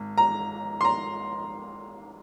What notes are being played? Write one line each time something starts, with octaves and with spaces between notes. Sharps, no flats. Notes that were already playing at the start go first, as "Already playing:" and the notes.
Already playing: G#1
A#5
C6
A#5